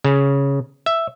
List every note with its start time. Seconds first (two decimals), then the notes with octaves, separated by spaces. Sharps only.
0.04 C#3
0.86 E5